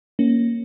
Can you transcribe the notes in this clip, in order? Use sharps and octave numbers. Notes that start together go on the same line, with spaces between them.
A#3 C#4